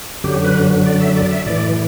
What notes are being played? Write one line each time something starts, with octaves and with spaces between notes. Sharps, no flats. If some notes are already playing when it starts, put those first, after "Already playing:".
F#2 D3 F#3 G4
B4
D5
E5
D5
E5
A2 E3 D5